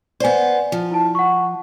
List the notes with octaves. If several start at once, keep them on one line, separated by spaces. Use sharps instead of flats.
B3 C5 D5 G#5
F3
E4 A5
F#5 C#6